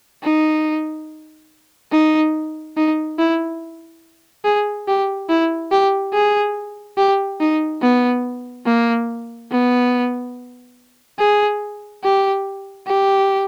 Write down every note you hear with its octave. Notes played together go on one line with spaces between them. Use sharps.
D#4
D#4
D#4
E4
G#4
G4
E4
G4
G#4
G4
D#4
B3
A#3
B3
G#4
G4
G4